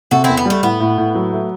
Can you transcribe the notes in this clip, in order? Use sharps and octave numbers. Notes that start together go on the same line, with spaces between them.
C3 F#4 A4
E2 C4 E4
B3
G3 A3
A2 B3
A2
A2
F#3
A3